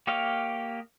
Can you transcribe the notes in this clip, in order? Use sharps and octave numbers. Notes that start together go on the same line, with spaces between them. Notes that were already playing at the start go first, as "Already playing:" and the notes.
A#3 G4 C#5 D#5 F5